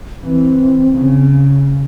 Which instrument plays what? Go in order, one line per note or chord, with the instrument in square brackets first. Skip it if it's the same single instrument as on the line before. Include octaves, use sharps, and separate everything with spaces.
[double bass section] E3 [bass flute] C4
[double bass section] C#3